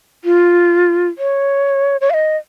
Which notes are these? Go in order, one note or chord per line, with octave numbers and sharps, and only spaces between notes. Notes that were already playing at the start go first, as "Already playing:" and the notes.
F4
C#5
C#5
F5
D#5